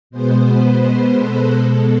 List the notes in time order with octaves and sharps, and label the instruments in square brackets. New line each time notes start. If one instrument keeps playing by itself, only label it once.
[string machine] B2 G#3 B3 C5
B4
A4
B2 G#3 B3 A4